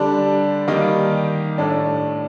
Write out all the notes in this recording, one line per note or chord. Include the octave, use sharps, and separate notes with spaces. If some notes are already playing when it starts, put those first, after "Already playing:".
Already playing: D3 G3 D4
D#3 G3 A#3 D#4
A2 A3 D4